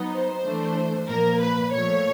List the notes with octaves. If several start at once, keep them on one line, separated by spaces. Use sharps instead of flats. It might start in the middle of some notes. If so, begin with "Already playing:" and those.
Already playing: F#3 B3 D#4
C5
E3 A3 D4
A#2 F3 A#3 A#4
B4
A#2 F3 A3 C#5